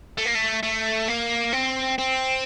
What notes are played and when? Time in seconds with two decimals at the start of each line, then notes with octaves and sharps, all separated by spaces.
0.18 A3
0.25 A#3
0.35 A3
0.63 A3
1.08 A#3
1.53 C4
1.98 C4